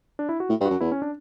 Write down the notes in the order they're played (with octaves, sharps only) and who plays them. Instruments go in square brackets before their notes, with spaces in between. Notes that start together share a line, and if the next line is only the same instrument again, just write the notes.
[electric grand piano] D4
E4
F#4
[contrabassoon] A2
G2
[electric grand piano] F#4
[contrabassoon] F#2
[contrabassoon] E2 [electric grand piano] E4
[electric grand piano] C#4
D4